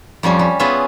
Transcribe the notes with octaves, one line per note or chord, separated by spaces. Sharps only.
F2 F3 G3 C#4
G3
B3 C#4 F4 G#4 B4 E5